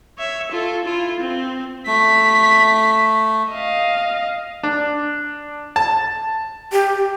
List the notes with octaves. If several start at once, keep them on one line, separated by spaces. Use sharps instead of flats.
C#5 E5
F4 A4
E4 F4
C4
A3 B6
D#5 F5
D4
A5
G4